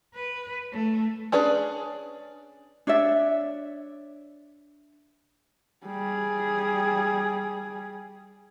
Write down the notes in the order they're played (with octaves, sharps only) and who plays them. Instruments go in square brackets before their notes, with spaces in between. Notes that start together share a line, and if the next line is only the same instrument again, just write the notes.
[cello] B4
A3
[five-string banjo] C#4 D4 G#4 B4
[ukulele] D4 C#5 D5 E5
[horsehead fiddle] G3 G#4